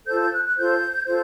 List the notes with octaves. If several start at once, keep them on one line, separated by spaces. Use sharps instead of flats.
F4 A4 C5 G6
G6
F#6
F#6
F4 A4 C5 G6
F4 A4 C5 G6